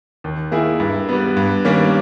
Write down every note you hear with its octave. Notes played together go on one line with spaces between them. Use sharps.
D#2
D#3 A#3 E4 G#4
G2
G3 B3
G2
D#3 G3 A#3 C#4